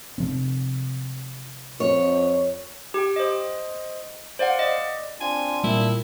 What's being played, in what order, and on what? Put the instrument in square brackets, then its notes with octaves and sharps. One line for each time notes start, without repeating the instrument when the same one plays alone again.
[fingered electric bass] C3 F3 C4
[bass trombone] F2 [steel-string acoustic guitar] C#5
[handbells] G4 G5
C5 D#5
C5 D5 F5 F#5
D5 D#5
[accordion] C4 D4 F4 [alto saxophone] G#5
[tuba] A#2 [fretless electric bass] G3 [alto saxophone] E4